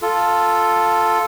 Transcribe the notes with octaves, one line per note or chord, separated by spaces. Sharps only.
F4 A4